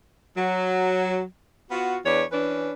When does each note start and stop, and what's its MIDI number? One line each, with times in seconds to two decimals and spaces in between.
0.37 1.23 54
1.71 1.97 59
1.71 1.97 65
1.71 1.97 66
2.05 2.22 40
2.05 2.22 62
2.05 2.22 71
2.05 2.22 73
2.31 2.72 52
2.31 2.72 61
2.31 2.72 62
2.31 2.72 71